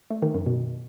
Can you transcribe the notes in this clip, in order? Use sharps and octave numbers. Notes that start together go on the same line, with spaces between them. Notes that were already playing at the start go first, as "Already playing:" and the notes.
A3
D#3
F#2
B2